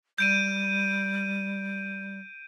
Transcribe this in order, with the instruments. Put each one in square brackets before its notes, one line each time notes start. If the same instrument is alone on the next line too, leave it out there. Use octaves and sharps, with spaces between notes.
[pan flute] G3 [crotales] G6 D7 D#7